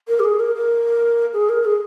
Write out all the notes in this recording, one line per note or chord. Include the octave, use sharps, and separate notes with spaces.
A#4
G4
G#4
A#4
A#4
G#4
A#4
G#4